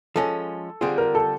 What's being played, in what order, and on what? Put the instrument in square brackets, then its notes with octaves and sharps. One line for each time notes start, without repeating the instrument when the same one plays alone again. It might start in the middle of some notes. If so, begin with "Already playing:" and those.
[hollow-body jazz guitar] F3 G#3 C#4 [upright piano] A4
[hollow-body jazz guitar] D3 G3 C4 F4 [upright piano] G#4
[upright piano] A#4
A4